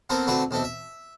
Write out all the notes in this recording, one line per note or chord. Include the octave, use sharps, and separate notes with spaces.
B3 C4 E4 A4 A#4 C5
D3 A3 C4 E4 F#4 B4
B1 C4 A4 E5
E5